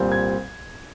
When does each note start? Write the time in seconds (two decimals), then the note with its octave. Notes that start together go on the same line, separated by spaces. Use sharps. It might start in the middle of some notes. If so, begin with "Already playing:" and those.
Already playing: C2 A#2 G3 C4
0.12 G#6